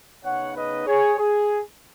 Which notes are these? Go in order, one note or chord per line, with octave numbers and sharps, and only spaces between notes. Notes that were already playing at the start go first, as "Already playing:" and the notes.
C#3 B3 D#4 C#5 F#5
B4 D#5
G#4 C#5
G#4